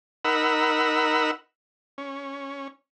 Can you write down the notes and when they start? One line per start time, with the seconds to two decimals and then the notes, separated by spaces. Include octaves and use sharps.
0.25 D#4 A#4 F#5 B5 E6
1.98 C#4